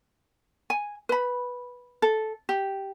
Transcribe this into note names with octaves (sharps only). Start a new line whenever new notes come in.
G#5
B4 B5
A4
G4